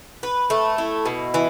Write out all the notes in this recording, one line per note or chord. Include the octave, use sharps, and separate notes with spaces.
B4
A3
E4
B2
E3